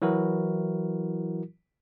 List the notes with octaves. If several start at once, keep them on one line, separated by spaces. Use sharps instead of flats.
E3 F#3 E4 F#4 A#4